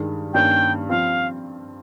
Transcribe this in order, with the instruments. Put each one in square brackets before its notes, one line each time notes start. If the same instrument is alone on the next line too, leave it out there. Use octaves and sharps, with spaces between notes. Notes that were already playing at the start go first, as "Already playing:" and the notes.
Already playing: [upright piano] G2 D#3 G#3
[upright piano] G2 D#3 A#3 C#4 [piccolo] G5
[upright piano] F3 C4 F4 [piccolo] F5